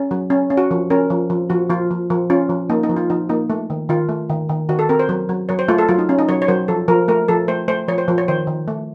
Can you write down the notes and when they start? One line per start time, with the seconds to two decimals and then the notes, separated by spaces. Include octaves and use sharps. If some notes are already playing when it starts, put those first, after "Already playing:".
Already playing: C#4
0.11 F#3
0.30 C#4
0.50 C#4
0.57 F#4
0.71 F3
0.90 C#4 A#4
1.10 F3
1.30 F3
1.50 F3 F#4
1.70 F3 F4
1.91 F3
2.10 F3
2.30 C#4 F4
2.50 F3
2.70 A#3 D#4
2.83 D#4
2.89 F3
2.97 F4
3.10 F3 D#4
3.29 A#3 D#4
3.50 A3
3.70 D#3
3.89 D#3 F4
4.09 A3
4.30 D#3
4.49 D#3
4.69 D#3 F#4
4.79 A4
4.89 C4 A#4
4.99 C5
5.09 F#3
5.29 F#3
5.49 F#3 C#5
5.59 C5
5.68 A3 F4
5.78 A4
5.89 F#3 F4
5.99 D#4
6.09 C#4
6.19 D#4
6.29 F#3 C#5
6.42 C#5
6.48 F#3 C5
6.68 F3 A4
6.88 F3 A#4
7.08 A3 A#4
7.28 F3 A4
7.48 A3 C5
7.68 A3 C5
7.88 F3 C#5
7.98 C5
8.08 F3 C5
8.18 C#5
8.28 D#3 C5
8.47 D#3
8.68 A3